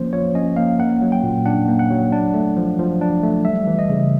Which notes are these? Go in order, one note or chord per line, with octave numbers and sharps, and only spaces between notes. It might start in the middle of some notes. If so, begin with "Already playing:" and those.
Already playing: F3 A#3 C#4 C5
F3 C#5
C#4 D#5
A#3 F5
A#3 F#5
F#3
G5
A#2
D4 F#5
A#3
F#5
F#3
D4
A3
F3
F3
D4
A3
G3 E5
E3
D#5
C#3